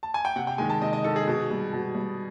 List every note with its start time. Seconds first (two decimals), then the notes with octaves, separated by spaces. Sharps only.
0.03 A5
0.14 G#5
0.25 G5
0.36 C3 F#5
0.47 G5
0.58 D#3 G#3 G#5
0.70 A5
0.82 C3 D#5
0.93 D#5
1.04 D#3 G#3 A4
1.16 G#4
1.28 B2
1.50 G3
1.73 B2
1.95 G3